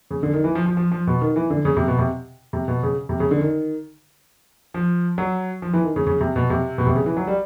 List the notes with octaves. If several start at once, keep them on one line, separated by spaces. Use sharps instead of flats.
C#3
D3
D#3
E3
F3
F3
F3
F3
B2
D#3
E3
D3
C#3
C3
B2
C3
C3
B2
C#3
C3
C#3
D3
D#3
F3
F#3
F3
E3
D#3
C#3
C#3
C3
B2
C3
B2
C3
C#3
E3
F#3
G3